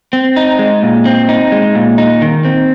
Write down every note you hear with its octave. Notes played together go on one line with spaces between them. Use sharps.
C4
D#4
G#3
A#2
C4
D#4
G#3
A#2
D#4
D#3
C4